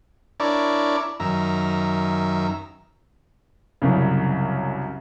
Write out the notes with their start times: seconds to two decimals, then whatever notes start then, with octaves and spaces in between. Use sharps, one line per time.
0.40 D4 E4 A#4 C#5 D5
1.20 F#2 D#3 E5 A#5
3.82 C2 F#2 C#3